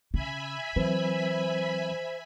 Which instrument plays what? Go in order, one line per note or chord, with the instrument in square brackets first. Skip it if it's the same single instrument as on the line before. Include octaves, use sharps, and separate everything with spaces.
[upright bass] C#3 [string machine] E5 G#5 B5
[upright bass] E3 [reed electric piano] F#3 C4 B4 [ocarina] C5